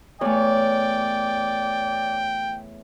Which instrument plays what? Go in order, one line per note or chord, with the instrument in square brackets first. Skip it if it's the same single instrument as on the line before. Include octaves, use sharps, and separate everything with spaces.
[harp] E2 A3 [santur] C#5 [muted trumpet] D5 [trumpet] G5